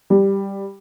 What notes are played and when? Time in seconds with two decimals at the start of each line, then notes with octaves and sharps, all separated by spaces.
0.10 G3